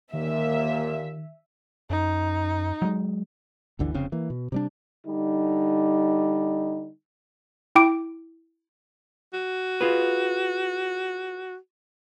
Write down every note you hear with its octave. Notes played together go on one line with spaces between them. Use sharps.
D#2 A#2 D#3 A#3 E5
F#2 D#4
F#3 G#3
G1 D2 D3 E3
F1 C#3 C4
E3 A#3
B2
C3 G3 D4
D3 G3 D#4
E4 G5 D6 D7
F#4
F4 G#4 B4